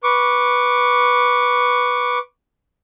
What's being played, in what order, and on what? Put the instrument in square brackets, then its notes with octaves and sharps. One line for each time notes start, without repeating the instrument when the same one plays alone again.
[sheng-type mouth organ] B4 C#6 D6